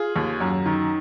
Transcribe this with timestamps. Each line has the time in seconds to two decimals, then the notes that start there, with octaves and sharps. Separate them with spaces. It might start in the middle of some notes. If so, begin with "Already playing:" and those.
Already playing: F4 G#4
0.16 D#2
0.40 F#2
0.66 D#3